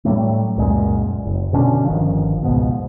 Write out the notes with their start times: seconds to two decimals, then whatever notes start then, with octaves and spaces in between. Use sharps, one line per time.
0.05 A2 F#3 G3 A3
0.57 C#2 F#2 A#2 G#3
1.25 F#1
1.53 B2 D3 C#4 D4
1.85 G1 D#3 F3
2.43 C#2 G#2 B2